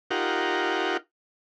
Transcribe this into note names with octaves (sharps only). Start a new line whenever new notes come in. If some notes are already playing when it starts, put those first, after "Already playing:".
D#4 F4 G4 A#4 F#5